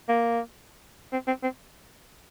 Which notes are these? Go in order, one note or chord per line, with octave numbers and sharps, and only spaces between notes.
A#3
C4
C4
C4